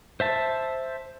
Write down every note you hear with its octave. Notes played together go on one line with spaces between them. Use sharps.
C5 E5 A5